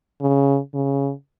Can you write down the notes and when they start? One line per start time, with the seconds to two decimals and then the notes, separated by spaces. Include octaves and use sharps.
0.21 C#3
0.74 C#3